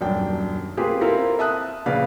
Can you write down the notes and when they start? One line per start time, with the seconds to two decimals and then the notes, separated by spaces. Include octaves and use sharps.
0.01 D#1 F#2 D4 G5
0.77 A#3 C4 F4 G4 G#4 B4
1.01 C4 E4 F4 A4 A#4
1.39 E5 A5 D#6 F#6
1.86 A#1 C#3 B4 D5 F5